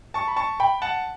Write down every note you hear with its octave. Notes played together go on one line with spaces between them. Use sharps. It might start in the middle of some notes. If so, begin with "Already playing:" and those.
A5 C#6
B5
A5 C#6
G5 B5
F#5 A5